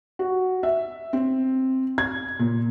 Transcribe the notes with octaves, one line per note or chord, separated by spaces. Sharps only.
F#4
E5
C4
G#6
A#2